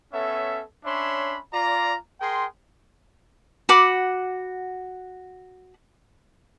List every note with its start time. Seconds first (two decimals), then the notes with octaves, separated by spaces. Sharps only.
0.14 B3 C#4 A4 C#5 E5
0.85 C#4 D4 C#5 E5 B5 C6
1.53 F4 D5 A#5
2.21 G#4 A#4 G5 C6
3.69 F#4 F#5 B5 D6